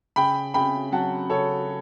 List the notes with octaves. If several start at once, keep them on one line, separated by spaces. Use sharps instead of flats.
C#3 G5 B5
C#3 G5 B5
F#3 F#5 A5
C#3 A4 C#5